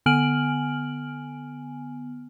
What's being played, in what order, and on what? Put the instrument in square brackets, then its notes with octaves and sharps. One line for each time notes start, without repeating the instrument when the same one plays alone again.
[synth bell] D3 B3 G#5 F6 D7 F#7